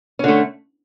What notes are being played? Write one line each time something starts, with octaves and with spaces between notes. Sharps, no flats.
D3 A3 C#4